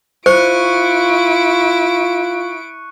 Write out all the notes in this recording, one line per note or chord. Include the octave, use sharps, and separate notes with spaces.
E4 F4 C5 C#6 F#6 C#7 D7